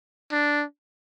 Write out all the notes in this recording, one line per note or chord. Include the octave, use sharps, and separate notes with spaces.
D4